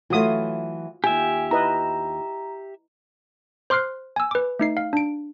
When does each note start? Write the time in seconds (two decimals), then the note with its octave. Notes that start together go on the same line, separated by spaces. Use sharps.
0.10 E3 F#3 A3 F4 F#4 D#6
1.04 D#2 F4 G4 E5 G#5
1.51 E4 B4 D#5 A#5
3.70 C5 C6 D6 F6 F#6 C7
4.16 G#5 E6
4.31 B4 D6
4.59 A3 D#4 C7
4.77 F5
4.93 D4 D7